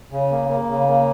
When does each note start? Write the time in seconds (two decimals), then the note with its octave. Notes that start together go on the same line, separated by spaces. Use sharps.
0.12 C#3
0.31 A#3
0.49 A#3
0.69 C#3
0.88 A#3